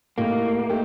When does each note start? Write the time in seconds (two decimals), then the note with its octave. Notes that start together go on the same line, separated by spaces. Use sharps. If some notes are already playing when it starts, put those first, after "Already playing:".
0.18 A2 A3 A#3 D#4 G4
0.69 A3 D#4 G4